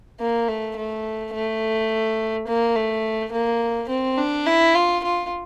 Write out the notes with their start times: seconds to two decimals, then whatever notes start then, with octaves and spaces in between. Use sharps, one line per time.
0.20 A#3
0.48 A3
0.77 A3
1.34 A3
2.47 A#3
2.76 A3
3.33 A#3
3.89 C4
4.18 D4
4.46 E4
4.75 F4
5.04 F4